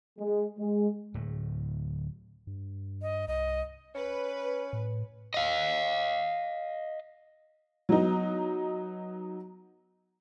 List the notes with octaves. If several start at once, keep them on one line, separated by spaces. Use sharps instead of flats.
G#3
G#3
D1 A2
G2
D#5
C2 D#5
C#4 B4
A2
D#5 F5
F#3 B3 D#4